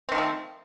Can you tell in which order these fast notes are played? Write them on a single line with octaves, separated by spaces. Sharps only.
C4 D#3 F3 A3